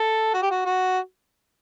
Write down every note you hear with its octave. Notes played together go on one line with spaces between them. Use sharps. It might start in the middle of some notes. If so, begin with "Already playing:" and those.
Already playing: A4
F#4
G4
F#4
F#4